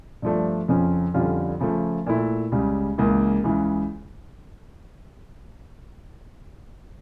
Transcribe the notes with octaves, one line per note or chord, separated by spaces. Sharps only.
G2 F3 A3 D4
F2 C#3 F3 C#4
F2 D3 G3 C#4 F4
C#3 F3 A3
A#2 A3 E4
C#2 C#3 G3
C#2 C#3 E3 A#3
C#2 C#3 E3